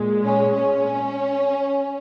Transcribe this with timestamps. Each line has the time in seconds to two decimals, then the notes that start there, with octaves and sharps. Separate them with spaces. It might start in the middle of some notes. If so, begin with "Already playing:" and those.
Already playing: A#2 G#3
0.24 C#4
0.54 C#4